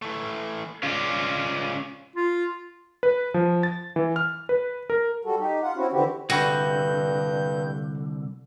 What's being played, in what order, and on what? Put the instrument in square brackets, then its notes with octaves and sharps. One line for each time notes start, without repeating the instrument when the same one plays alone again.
[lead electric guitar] E3 A3
[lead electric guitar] C#3 D5 [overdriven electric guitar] C#4 F4
[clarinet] F4
[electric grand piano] B4
F3
A6
E3
F6
B4
A#4
[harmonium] G3 F#4 A4
D#4 G4
F4 F#5
C4 C#4 E4 F#4
D3 E3 C4 E4 F#4 G4
[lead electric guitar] C2 D3 [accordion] G2 G6 [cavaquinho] F#4 [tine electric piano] G5 B5